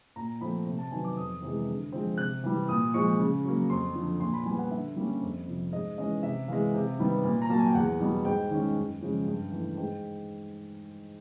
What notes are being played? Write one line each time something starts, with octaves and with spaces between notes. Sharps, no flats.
A#2 A#5
F3 A3 C4 B5
C3
A5
D#3 F#3 B3 G#5
D6
F2 D#6
C3 E3 G#3
D3
F3 G#3 C4
C3 F#6
E3 G3
A#2 D#6
F3 G#3 C#6
C#3
F#3 A#3
F2 C6
D3 F3
A#2 C6
B5
G3 B3 G#5
F#5
D3 E5
G3 A#3 C#4
F2
C3 F3
G#2 D#5
E3 G#3 C#4 D#5
C3 E5
E3 G#3 F5
C3
D#3 G3 B3
A#2
A#5
F#3 A#3 A5
G#5
G5
E2 F#5
B2 G3
G#2 G5
D#3 G#3 C#4
F#2
C#3 F3 G#3 C#4
G2
E3 A3
G#2 G5